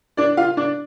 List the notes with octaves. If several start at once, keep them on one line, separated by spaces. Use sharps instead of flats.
D4 D5
F4 F5
D4 D5